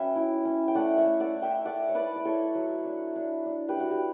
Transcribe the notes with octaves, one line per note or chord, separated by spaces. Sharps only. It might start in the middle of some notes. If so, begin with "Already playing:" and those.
Already playing: F#3 C#4 B4 E5 G5
E4
C#4
G5
A3 D5 F#5
C#5 E5
A3
D5 F#5
E4
E5 G5
A3 D5 F#5
C#5
E4 B4 D5
D5
E4 A4 C#5
F#3
D4
D4
D4
G4 B4
D4 F#4
G4